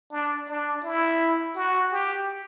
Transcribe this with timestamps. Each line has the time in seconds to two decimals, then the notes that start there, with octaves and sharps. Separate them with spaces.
0.12 D4
0.49 D4
0.84 E4
1.55 F#4
1.92 G4